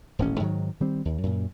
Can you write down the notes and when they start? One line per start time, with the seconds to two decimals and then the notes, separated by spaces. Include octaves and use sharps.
0.19 D#1 A1 A2 C#4
0.40 G#2 D#3 F3 F#3
0.80 D#3 G3 C4
1.05 D#2
1.23 F#2 A#2